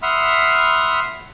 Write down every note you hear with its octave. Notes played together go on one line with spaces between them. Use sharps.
E5 F#5 B5 C6 D#6 F6